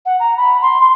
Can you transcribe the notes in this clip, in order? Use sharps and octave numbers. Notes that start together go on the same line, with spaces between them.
F#5
A#5
B5
C6
C6